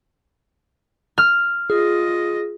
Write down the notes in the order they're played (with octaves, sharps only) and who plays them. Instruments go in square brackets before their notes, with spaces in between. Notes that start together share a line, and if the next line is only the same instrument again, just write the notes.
[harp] F6
[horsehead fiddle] F4 D#5 [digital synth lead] G#4